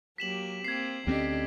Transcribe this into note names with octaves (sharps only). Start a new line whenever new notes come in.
F#3 A#3 G4 B6 E7 F#7
A#3 C4 G#6 C7
D2 D3 C4 C#4 G4 D#5